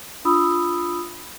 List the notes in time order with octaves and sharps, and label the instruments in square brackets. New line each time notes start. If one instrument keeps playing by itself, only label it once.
[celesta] D4 F4 B5 D#6 E6